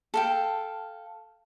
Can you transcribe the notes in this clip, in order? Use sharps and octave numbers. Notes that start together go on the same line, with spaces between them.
A4 F5 G5